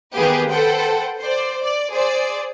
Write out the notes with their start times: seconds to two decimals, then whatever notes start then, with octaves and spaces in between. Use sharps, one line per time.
0.16 D#3 A#3 B3 G4 G#4 B4
0.52 A4 B4 C5 F#5 G5
1.20 C5 D5
1.62 D5
1.92 G#4 C5 D5